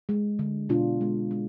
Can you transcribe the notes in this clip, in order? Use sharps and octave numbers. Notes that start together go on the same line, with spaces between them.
G#3
D3
B2 D4 F4
G#3
G#3